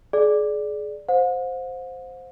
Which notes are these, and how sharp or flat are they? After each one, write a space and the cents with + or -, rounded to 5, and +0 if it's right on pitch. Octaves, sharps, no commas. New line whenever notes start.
G#4 +30 D5 +0
C5 +0 F#5 -45